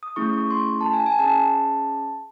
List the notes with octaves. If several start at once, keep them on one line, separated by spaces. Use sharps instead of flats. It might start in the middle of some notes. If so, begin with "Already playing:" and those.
D#6
A3 C#4 E4 G#4 C#6
C#6
C6
A5
G#5
G#5
C#4 G#4 A5